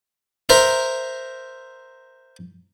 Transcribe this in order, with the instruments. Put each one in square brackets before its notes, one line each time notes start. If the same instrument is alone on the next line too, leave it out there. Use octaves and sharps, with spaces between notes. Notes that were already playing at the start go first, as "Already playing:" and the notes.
[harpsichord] A#4 C5 E5